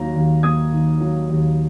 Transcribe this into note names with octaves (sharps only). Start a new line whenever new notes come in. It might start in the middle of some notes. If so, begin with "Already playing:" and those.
Already playing: D#2 D#3 F#3 A#3 A#5
D#2
A#3 D#6 G#6
D#3
F#3
D#2